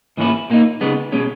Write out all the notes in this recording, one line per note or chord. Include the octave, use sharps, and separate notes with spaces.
G#2 E3 A#3 C#4 E4
A#2 A#3 D#4
C#3 G#3 B3 D#4
B2 G#3 C#4